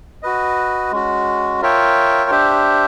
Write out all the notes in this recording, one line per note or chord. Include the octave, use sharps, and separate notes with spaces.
F#4 B4 D#5
G#3 C#4 F#4
F4 A#4 C#5 E5 G5
D4 G4 C5 E5